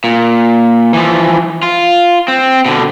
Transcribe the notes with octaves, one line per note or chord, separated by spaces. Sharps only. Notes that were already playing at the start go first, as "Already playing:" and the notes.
A#2
E3 F3
F4
C4
B2 D3